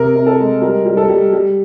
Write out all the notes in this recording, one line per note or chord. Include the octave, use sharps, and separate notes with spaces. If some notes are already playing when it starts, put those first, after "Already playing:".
Already playing: C3 A#4
C3
A4
G#3
G3 A#4
G3
A4
G3
G3